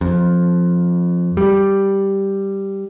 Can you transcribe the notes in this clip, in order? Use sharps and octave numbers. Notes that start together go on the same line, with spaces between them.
F2
G3